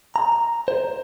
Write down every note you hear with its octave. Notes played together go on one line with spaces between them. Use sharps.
A#5
C5